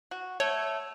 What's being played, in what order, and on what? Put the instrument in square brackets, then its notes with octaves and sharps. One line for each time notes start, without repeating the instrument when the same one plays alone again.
[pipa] F#4
[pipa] A3 [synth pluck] C#5